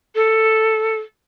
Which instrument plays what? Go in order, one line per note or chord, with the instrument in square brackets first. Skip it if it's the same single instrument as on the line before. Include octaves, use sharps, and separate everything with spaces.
[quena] A4